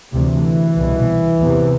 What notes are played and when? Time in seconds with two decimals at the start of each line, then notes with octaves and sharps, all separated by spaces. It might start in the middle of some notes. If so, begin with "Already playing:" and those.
0.13 D2 C3 E3
0.77 C2 B2
1.42 E2 C3